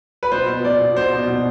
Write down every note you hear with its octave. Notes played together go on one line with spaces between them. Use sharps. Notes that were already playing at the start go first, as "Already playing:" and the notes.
B4
B2 C5
B2
B2 D5
B2
B2 C5
B2
B2